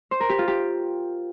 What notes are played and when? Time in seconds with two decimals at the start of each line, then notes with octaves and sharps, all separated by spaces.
0.11 C5
0.20 A#4
0.29 G4
0.39 F4
0.48 G4